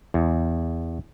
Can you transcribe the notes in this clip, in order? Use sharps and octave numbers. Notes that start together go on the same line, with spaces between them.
E2